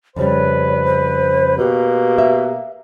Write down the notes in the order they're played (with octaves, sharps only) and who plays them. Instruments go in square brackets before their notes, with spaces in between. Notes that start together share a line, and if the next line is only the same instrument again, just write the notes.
[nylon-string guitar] F2 C#3 G3 [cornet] B4 [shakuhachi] C#5
[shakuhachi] C5
[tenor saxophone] B2 [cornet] A#3 [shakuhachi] G4
[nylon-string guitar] E5